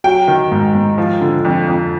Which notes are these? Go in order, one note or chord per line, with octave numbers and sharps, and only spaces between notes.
F#3 G5
D#3
G#2
G#2
F3
D3
F2
F2